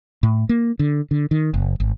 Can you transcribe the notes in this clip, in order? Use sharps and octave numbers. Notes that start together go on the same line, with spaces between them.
A2
A#3
D3
D3
D#3
F#1
G#1